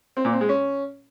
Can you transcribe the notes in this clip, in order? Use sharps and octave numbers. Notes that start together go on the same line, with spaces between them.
C4
A#2
C4
G#3
C#4